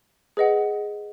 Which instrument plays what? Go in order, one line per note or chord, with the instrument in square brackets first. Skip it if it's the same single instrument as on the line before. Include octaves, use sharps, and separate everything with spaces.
[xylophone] G#4 B4 D#5 F#5